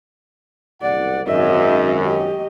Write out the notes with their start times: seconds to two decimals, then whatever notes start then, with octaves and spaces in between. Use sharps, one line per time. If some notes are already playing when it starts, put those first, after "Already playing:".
0.82 F#1 C2 D5 F#5
1.27 G#1 F#2 D#5 E5
2.03 G4 D#5